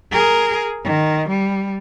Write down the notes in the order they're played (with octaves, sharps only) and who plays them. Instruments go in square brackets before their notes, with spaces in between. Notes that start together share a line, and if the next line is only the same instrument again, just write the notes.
[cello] G#4 A#4
D#3
G3